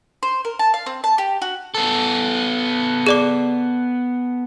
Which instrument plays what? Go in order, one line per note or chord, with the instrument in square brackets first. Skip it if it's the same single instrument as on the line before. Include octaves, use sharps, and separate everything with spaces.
[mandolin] C5
A#4
A5
F5
C4
A5
G4
F#4
[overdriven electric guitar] B3 A4
[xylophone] G#4 D5 D6